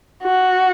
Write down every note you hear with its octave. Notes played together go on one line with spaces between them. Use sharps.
F#4